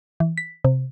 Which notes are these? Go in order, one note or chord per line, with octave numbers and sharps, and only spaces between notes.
E3
B6
C3